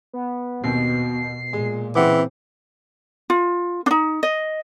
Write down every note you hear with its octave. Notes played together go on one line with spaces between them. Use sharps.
B3
D#2 B2 C4 C7
A#2 G#3
C#3 E3 C4 F#5 D6
F4
D4 D#4
D#5